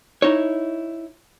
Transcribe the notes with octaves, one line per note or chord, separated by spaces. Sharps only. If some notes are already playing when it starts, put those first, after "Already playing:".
D#4 E4 C#5